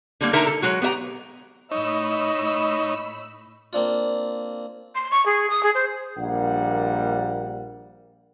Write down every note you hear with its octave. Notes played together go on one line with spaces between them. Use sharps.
D3 G3 A#3
D3 D#4 A#4 E5 A#5
A4
F#3 G#3 F#4
B3 G4 E5 A#5
A2 D#4 C#5 D#5 B5 E6
A#3 C4 D4 F4
C6
C#6
G#4
D#6
G#4
C5
A#1 G3 A#3 F#5